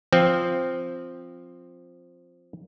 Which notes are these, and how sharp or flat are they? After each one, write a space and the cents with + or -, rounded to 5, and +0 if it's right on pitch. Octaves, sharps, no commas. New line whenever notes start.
F3 +0 C4 +0